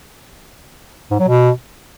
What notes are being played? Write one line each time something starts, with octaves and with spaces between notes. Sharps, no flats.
G#2
F#3
B2